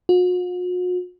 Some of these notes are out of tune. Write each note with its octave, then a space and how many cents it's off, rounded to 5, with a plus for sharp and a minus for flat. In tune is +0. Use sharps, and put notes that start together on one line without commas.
F#4 -45